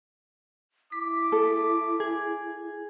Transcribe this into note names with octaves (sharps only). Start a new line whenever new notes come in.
E4 D6 B6
A4
G#4